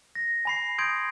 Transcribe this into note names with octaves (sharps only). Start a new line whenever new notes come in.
A#6
G#5 B5 C7
C6 D#6 G6 G#6 D7